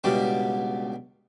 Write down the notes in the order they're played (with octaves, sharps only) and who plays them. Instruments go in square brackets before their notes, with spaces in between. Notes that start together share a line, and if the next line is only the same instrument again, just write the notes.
[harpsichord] C#2 B2 G3 B3 D4